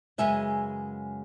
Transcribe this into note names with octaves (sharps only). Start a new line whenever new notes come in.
F#2 C#3 G#3 B3 E5 G#5